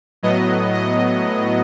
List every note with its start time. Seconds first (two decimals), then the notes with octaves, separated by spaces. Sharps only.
0.23 A2 F#3 B3 D#5
0.74 D#5